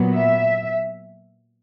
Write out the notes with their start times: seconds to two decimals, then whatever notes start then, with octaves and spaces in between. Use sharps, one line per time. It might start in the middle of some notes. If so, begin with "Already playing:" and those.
Already playing: A#2 F#3 B3
0.15 E5